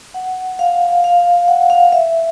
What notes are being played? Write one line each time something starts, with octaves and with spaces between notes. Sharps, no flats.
F#5
F5
F5
F5
F#5
F5
E5